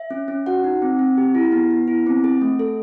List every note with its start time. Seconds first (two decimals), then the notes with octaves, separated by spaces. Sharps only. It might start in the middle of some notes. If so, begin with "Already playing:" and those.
Already playing: E5
0.11 C#4
0.28 C#4
0.46 F#4 F#5
0.64 D#4
0.82 C4
0.99 C4
1.18 G4
1.35 E4
1.52 B3
1.70 B3
1.88 E4
2.06 C4
2.24 G#4
2.41 A3
2.59 A4